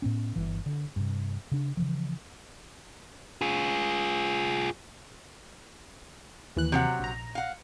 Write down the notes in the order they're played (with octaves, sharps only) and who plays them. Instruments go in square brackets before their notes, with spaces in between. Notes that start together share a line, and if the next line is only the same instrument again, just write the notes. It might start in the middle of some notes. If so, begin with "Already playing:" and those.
[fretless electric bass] A2 B3 C#4
G1 E3
D3
G2 C3
C#3 D4
C#3 E3 F3
[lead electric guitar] F4 G#4
[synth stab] D#2 E3 F#6
[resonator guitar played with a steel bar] C3 F#3 F#5
[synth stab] A#1 A#5
[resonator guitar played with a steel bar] F5 F#5